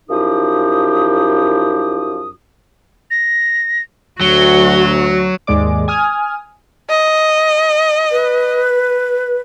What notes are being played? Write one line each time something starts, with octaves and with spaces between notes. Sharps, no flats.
F#2 F3 D#4 E4 G4 D#6
A#6
D2 F#3 F#4 G7
D#2 G#2 G#3 D5 D6
G#5 D#6 F6
D#5
B4